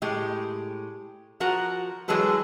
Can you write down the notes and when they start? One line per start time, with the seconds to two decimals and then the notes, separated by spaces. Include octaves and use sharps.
0.02 A2 G#3 G4
1.40 F3 F#4 A#4 F#5
2.08 E3 F#3 G#3 G#4 A4 B4